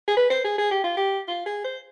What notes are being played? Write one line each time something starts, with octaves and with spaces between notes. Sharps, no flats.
G#4
B4
C5
G#4
G#4
G4
F4
G4
F4
G#4
C5